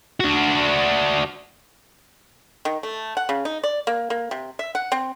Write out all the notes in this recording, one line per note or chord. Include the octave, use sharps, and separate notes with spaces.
D4 F#4
D#3
A3
F#5
C#3
D#4
D5
A#3
A#3
C3
E5
F#5
C4